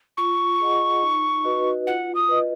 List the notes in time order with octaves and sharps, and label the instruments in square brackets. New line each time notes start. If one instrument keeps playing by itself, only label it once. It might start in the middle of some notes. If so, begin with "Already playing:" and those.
[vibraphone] F4 [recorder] C#6
[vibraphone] G#4 D#5 F#5
D#4
F#4 B4 D#5
[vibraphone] F4 [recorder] F#5
[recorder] D#6
[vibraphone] B4 D#5